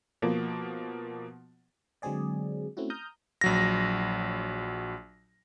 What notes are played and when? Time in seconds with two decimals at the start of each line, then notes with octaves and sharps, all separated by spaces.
0.22 B2 F3 A#3
2.02 D3 F#3 G#3 C4 G#4 D5
2.77 A3 C4 C#4 E4 F#4
2.90 A#5 D#6 F6 G6
3.41 A#1 F#3 A#6